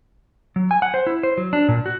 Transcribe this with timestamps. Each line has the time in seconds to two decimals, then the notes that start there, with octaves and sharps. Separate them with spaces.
0.56 F#3
0.71 G#5
0.82 F#5
0.94 C5
1.07 E4
1.23 C5
1.38 F#3
1.53 D4
1.68 A#2
1.86 F#4